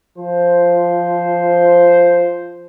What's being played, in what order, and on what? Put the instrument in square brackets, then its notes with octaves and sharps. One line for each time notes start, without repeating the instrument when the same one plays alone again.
[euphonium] F3 [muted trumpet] C5